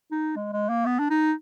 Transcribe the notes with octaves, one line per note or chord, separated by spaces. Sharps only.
D#4
G#3
G#3
A#3
B3
D4
D#4